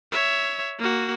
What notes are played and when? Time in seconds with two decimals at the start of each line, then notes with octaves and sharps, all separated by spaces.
0.12 C#5 E5
0.79 A#3 F#4